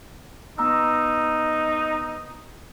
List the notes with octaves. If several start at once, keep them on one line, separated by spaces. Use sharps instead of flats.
B3 D#4 A#5 E6